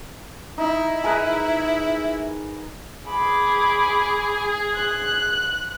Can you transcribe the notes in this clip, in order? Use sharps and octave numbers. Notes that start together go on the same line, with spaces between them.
D#4 E4
G#4 A#4 B4
G#4 B5 D6
F#6